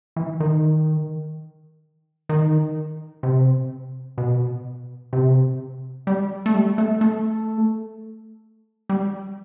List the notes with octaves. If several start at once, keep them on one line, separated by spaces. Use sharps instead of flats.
E3
D#3
D#3
C3
B2
C3
G3
A3
G3
A3
A3
G3